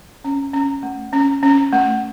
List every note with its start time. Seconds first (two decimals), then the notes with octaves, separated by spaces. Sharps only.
0.25 C#4
0.54 C#4
0.83 A3
1.13 C#4
1.43 C#4
1.73 A3